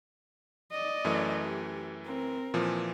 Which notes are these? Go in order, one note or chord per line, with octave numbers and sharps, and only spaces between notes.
D5 D#5
F#2 E3 A3
G4
C4 A#4
A#2 E3 F3